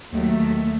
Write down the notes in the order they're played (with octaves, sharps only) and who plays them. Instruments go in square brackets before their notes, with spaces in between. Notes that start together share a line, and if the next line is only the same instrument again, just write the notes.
[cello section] D#2 D#3 F#3 A3